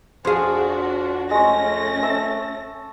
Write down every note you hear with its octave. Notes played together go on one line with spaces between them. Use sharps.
F2 D4 F#4 G#4 C5 F5
G#3 A3 C#4 C#5 A#6
E5 A5 E6